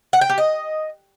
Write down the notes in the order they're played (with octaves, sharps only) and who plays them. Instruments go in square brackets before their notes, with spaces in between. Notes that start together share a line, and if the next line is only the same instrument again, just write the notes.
[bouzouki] F#5
G5
G4
D#5